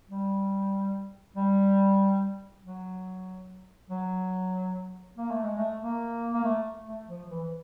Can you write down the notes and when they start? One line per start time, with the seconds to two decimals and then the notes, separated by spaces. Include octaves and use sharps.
0.10 G3
1.37 G3
2.64 F#3
3.90 F#3
5.18 A#3
5.31 A3
5.44 G#3
5.58 A3
5.81 A#3
6.33 A#3
6.44 A3
6.87 A3
7.08 F3
7.29 E3